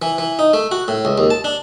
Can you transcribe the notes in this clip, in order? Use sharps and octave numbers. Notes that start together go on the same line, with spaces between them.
E3
E3
D#4
A3
F#4
A2
C#2
D#2
A5
D4